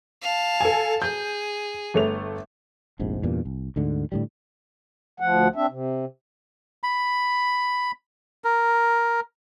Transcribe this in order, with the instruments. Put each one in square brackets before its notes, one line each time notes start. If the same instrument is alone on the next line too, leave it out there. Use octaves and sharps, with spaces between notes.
[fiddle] F5 A5
[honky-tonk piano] A4 G#5
[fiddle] G#4 [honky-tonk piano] G6
[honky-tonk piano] G1 A3 F7
[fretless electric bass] F1 A#1 G#2 C3
E2 G2 A#2
C2
D2 G#2 D3
A2 D3 G3
[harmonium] D2 F3 F#5
C4 D4 E5
C3
[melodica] B5
A#4